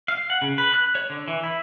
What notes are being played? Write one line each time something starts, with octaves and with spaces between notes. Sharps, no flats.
F5
F#5
C#3
B4
F#6
C#5
D3
E3
E4